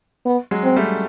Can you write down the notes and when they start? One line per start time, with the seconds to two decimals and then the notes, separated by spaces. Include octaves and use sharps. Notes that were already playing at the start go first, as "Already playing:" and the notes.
0.26 B3
0.51 F#3 G#3
0.64 C4
0.76 G3 A3